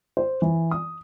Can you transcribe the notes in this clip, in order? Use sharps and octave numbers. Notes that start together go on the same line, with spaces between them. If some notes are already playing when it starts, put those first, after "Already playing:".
C5
E3
D#6